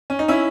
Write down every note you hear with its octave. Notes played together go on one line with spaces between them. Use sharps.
C#4
D#4
C#4 E4